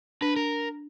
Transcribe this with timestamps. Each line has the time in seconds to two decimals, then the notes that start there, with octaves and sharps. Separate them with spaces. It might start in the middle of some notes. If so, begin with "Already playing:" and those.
0.21 D4 B4
0.36 A#4